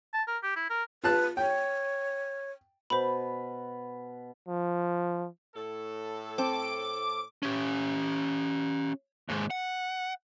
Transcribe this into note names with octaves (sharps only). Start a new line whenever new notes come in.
A5
A#4
G4
E4
A#4
F4 B4 A5 F#6
C#5 G5
B2 B4 C5 B5
F3
A2 A4
C4 A5 D6
C#4 G4
D#2 G#2
F#5